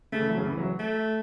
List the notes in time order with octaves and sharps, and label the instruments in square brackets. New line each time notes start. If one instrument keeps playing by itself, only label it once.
[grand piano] C#3 [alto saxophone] A3
[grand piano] E3
F#3
C#3
E3
F#3
[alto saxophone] A3